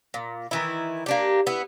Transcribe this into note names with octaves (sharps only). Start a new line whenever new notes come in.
A#2
D#3 E3 E4
A#3 D4 G4
B3 E4